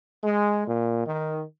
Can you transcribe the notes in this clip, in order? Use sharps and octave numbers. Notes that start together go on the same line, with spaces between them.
G#3
A#2
D#3